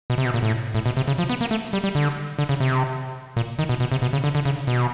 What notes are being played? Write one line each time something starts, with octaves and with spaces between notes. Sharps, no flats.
B2
C3
B2
A#2
A2
A2
B2
C3
C#3
F3
B3
A#3
A3
G3
G3
D3
D3
C#3
C3
A#2
D#3
B2
B2
C3
B2
C#3
D3
D3
C#3
B2